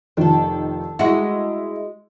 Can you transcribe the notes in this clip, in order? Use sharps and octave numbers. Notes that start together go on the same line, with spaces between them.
F1 D#3 F3 D4 A4
G#3 E4 F#4